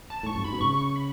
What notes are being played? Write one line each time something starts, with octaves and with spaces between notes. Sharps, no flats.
A5
A2
G#2 C#6
F#2
G#2 B5
B2
C#3 C#6
B5